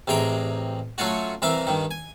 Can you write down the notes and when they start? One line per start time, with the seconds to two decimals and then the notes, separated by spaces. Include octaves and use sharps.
0.07 A1 C3 G#4 G5 A#5
0.98 F#3 A3 C#4 F4 F#4
1.42 C2 E3 A#4 E5 F5
1.67 G2 D#3
1.91 G#5